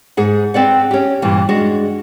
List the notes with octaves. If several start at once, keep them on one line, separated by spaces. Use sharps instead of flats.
G#2 G#4 F#5
C4 B4 D5 F#5
C#4 G4
G2 A#2 E3
G#3 D4 F#4